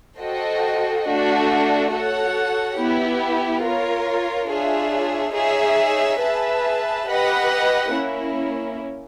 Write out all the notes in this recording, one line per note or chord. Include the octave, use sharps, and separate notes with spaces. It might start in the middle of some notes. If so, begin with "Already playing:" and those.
F#4 A4 C5 D#5 G5
A3 D4 F#4
F#4 A4 C#5 F#5
B3 E4 G4
F4 A#4 C#5
D4 F4 G#4 C#5 E5
D#4 G#4 C#5 E5
G#4 B4 E5 A5
G4 B4 D#5 F#5
A#3 C#4 E4